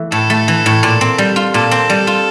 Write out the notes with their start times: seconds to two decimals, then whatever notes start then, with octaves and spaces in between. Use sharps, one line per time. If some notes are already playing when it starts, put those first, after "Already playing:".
Already playing: E3 A3
0.12 A2 A4
0.30 A3
0.48 E3
0.66 A2
0.83 A#2
1.01 C4
1.18 G3
1.36 F4
1.54 A#2 A4
1.71 C4
1.90 G3
2.07 F4